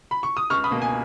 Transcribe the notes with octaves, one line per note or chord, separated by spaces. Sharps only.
B5
C#6
D#6
C#2 C#6 F6
B5 D#6
B2 A#3
G#5